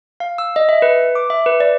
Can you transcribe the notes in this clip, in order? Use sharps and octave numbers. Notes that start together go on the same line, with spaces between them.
F5
E6
D#5
E5
B4
D6
E5
B4
D5